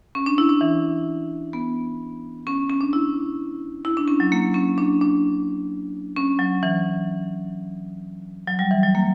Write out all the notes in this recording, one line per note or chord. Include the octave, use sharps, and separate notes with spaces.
C#4
D4
E4
D4
E3
B3
C#4
C#4
D4
E4
E4
D4
C#4
F#3
A#3
C#4
D4
D4
C#4
F#3
E3
F#3
G3
E3
F#3
A#3